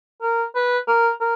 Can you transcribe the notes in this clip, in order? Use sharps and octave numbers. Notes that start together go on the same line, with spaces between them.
A#4
B4
A#4
A#4